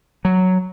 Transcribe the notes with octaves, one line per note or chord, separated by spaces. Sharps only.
F#3